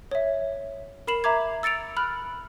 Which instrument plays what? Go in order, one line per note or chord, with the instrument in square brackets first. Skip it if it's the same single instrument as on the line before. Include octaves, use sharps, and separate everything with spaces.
[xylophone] C#5 E5
A#4 B5 C7 E7 F#7
E5 A#5 D6 G#6
E6 A6 C#7 D7 F7
B5 F6 F#6